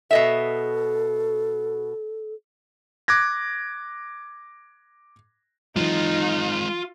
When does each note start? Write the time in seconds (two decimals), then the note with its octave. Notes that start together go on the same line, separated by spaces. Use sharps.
0.11 B2 A4 D#5 E5
3.08 D6 F#6 G#6 A#6
5.76 E3 F#3 G#3 C4 D#4 F4